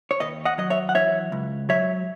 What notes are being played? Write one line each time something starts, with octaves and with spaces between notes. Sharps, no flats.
C#5
D#2 B4 D#5
D#5 F#5
F#3 D#5
C#5 E5
F#5
E3 C#5 E5
C#2
F#3 C#5 E5